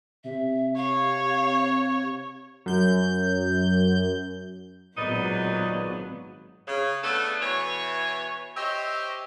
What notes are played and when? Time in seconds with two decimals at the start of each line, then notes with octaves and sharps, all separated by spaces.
0.24 C3 E5
0.77 C#5 F5
2.66 F#2 G6
4.98 G#1 A#2 F#3 B3 D#4 B4 D5
6.68 C#3
7.04 A3 B3 D4 A4
7.42 B2 E3 C#5
8.57 G4 C5 C#5 D#5 E5